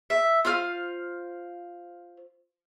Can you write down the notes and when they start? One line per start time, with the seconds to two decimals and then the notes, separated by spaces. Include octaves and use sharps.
0.10 E5
0.45 F4 C5 F5 F6